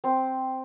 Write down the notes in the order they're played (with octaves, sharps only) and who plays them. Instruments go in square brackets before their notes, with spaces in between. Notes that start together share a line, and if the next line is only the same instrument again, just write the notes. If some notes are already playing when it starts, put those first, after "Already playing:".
[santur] C4